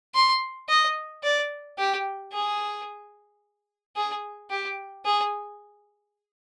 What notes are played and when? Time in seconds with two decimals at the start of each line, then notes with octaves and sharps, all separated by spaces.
0.15 C6
0.69 D#5
1.23 D5
1.78 G4
2.33 G#4
3.96 G#4
4.50 G4
5.05 G#4